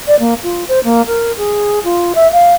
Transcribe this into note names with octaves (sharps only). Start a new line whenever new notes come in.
D5
A#3
F4
C5
A#3
A#4
G#4
F4
E5
F5